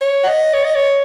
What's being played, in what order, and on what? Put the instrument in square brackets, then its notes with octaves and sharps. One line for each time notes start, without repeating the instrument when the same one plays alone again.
[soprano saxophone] C#5
F#5
D#5
C#5
D#5
C#5